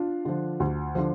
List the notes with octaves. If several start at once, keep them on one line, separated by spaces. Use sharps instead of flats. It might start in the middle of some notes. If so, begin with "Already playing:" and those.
Already playing: D4 F4
D3 F3
D2
D3 F3